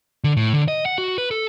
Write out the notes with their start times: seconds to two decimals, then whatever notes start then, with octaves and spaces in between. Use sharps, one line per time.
0.24 D3
0.37 A2
0.54 D3
0.68 D#5
0.86 F#5
0.98 F#4
1.18 B4
1.31 A4